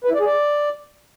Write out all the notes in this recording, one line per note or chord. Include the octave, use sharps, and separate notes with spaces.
B4
E4
D5
G#4
D5